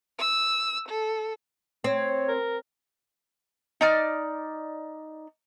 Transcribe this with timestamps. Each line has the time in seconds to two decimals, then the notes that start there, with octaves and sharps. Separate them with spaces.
0.19 E6
0.89 A4
1.84 C4 C#5
2.28 A#4
3.81 D#4 D5 F6